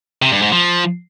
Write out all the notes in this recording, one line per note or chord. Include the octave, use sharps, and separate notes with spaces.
C3
G2
G#2
F3